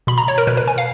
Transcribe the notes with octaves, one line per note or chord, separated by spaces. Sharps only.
B2 B5
A#5
C#5
A#4
B2 B4
B4
G#5
F5